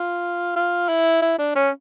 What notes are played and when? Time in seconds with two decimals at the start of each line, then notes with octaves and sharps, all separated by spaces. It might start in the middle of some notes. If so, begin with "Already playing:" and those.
Already playing: F4
0.56 F4
0.89 E4
1.22 E4
1.39 D4
1.55 C#4